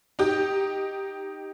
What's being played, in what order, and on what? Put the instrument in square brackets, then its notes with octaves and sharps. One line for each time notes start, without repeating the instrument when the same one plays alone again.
[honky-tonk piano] D#4 G4